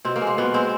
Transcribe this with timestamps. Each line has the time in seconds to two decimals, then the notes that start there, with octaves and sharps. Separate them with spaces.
0.05 B2 C4
0.16 A#3
0.21 G#3
0.27 A#3
0.38 B2 B3
0.54 G#3 C4